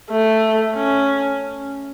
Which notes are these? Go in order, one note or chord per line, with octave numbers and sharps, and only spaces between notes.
A3
C#4